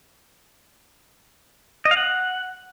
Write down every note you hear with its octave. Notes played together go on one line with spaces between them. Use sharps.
D#5
F5
F#5